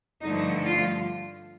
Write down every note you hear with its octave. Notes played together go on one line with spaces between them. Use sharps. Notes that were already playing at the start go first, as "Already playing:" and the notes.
G2 D3 F3 A3 D#4
F4